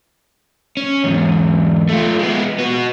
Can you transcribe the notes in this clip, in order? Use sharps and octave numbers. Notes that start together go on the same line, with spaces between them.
C#4
E2 G#2
A3 F4
G#3 B3
B3 F#4